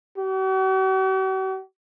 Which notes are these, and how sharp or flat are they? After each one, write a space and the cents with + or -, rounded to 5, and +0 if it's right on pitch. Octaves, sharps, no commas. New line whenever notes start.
F#4 +45